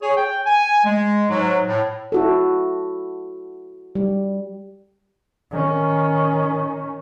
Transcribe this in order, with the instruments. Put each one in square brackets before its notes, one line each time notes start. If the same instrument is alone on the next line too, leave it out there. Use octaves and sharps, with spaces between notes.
[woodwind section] G#4 C#5
G5
G#5
G#3
G#2 F#3
A2
[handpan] E4 F#4 A4
G3
[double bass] D#3 C#4